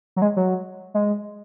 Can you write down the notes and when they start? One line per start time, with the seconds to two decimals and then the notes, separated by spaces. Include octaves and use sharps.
0.16 F#3
0.22 G#3
0.36 F#3
0.94 G#3